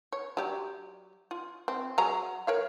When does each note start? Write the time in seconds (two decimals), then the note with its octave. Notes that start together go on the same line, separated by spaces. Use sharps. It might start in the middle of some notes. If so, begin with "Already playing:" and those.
0.13 C#5
0.37 F#3 G4 D5
1.31 F4
1.68 C4
1.98 F#3 G#4 A#5
2.47 A#4 C#5 F5